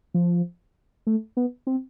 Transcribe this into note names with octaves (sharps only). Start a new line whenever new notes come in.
F3
A3
B3
C4